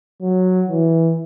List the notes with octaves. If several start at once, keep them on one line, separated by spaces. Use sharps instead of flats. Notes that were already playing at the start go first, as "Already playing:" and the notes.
F#3
E3